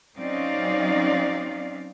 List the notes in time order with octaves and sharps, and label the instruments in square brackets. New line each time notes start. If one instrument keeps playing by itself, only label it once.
[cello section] F#3 C4 C#4 D#4 D5 F5